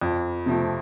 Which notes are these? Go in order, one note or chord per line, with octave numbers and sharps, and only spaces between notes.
F2
C3 F3 A3 C4